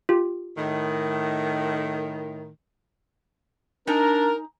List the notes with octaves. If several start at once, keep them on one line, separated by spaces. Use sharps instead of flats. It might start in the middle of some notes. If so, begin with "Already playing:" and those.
F4 G4
A2 D#3
D4 D#4 A#4 G#5 A#5